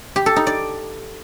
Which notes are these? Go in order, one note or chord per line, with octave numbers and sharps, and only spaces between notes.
G4
A4
D#4
D5